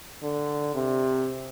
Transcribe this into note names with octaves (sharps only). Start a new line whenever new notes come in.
D3
C3